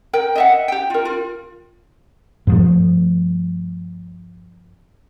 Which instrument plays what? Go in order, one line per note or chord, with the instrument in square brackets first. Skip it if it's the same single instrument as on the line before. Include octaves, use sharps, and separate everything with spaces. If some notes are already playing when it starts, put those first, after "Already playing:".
[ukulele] A#4 G5
D#5 E5 F#5
G4 G5
F4 A#4
F4
[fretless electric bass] G2 F3 A3